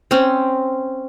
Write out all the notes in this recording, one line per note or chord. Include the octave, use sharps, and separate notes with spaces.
C4 C#4